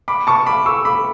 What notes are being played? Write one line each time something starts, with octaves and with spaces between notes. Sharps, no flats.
B5 D6
A5 C#6
B5 D6
C#6 E6
B5 D6